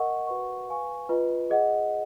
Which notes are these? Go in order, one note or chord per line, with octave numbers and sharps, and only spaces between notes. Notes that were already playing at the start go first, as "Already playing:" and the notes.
Already playing: A#4 D#5 F#5 C#6
F#4 B4 F#5 C#6
B4 F5 G#5 C#6
F4 B4 D#5
G#4 D#5 F#5